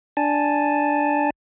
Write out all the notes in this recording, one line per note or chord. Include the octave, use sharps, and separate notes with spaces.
D4 G#5 A5